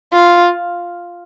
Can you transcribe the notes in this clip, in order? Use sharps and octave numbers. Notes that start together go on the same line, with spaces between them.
F4